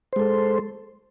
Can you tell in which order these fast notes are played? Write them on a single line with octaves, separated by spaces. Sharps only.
C5 G#3 A4